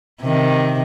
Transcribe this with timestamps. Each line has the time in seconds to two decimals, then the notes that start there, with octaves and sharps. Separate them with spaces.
0.22 C3 D#3